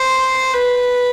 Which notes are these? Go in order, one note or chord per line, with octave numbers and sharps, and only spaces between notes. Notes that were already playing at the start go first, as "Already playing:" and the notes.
Already playing: C5
B4